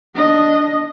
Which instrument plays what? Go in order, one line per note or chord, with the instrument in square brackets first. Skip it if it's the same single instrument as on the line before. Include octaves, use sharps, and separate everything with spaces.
[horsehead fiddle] D4 D#5